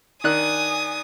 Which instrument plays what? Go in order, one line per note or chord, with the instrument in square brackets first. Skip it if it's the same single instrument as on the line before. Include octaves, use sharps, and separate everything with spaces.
[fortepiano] D#3 D4 F#6 [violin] G#5 D#6